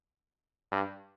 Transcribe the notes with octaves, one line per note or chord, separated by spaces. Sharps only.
G2